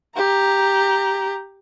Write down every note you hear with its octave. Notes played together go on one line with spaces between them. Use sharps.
G4 A#5